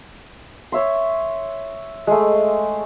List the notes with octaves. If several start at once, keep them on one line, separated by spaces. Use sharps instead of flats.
C#5 E5 C6
G#3 A3